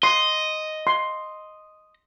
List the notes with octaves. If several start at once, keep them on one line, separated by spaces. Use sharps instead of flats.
D#5 C6
C6